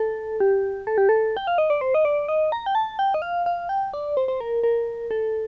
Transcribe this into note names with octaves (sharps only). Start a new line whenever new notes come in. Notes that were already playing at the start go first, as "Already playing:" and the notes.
Already playing: A4
G4
A4
G4
A4
G5
F5
D#5
D5
C5
D#5
D5
D#5
A#5
G5
A5
G5
D#5
F5
F5
G5
D5
C5
C5
A#4
A#4
A4